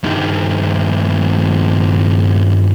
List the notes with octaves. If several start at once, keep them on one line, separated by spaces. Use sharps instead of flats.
G2 D#3